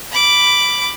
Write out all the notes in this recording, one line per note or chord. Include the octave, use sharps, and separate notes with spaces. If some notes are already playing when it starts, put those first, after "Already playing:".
B5 D6